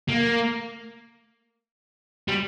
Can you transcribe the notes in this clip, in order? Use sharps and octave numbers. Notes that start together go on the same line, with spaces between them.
A#3
G3